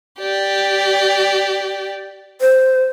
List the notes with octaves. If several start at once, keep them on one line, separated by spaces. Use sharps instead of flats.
G4 D5
C5